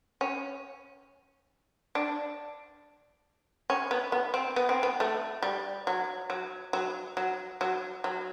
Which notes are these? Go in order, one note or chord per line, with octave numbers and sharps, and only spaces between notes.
C#4
D4
C#4
B3
B3
C4
B3
C4
B3
A3
G3
F#3
F#3
F#3
F#3
F#3
F#3